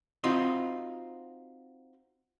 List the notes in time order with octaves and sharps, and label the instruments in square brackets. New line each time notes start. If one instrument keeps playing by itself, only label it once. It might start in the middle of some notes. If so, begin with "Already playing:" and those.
[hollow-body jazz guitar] C4 D#4 F4 F#4 D#5